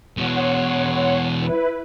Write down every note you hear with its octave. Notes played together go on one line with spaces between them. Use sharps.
E2 B2 C#5 F#5 C6
E4 B4